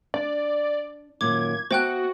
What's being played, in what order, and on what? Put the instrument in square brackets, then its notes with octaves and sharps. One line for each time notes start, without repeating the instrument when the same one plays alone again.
[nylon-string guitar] D4 [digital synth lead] D5
[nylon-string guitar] F#2 A#2 D#3 [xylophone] D6 [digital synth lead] G#6
[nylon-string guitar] B3 E5 A5 [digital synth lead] F#4 [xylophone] C5 G5 F#6